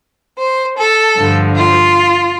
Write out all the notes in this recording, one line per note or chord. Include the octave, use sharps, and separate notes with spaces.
C5
A4
G2 D3 F3
F4